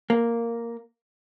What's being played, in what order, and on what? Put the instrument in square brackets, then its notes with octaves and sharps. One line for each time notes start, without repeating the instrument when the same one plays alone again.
[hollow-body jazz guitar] A#3